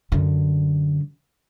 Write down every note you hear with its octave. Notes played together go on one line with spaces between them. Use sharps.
F#2 D3